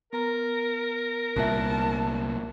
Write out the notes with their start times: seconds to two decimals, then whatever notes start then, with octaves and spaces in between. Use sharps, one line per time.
0.13 B3 A#4 A#5 A#6
1.36 C2 A#2 E5 A5 F#6